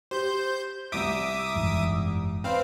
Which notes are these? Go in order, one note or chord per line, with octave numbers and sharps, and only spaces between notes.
G4 C5 G6
C2 E5 D6 D#6 D7
F#1 E2 G#2
C4 B4 C5 F5